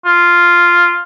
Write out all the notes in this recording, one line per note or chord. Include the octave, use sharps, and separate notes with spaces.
F4